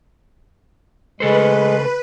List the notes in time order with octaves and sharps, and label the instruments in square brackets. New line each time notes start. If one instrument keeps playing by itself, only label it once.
[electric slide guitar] C#3 A4 C5 [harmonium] G#3 [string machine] B4